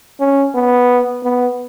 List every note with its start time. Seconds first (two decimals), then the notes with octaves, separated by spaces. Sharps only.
0.20 C#4
0.55 B3
1.23 B3